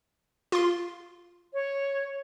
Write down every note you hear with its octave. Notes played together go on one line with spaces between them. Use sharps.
F4 C6
C#5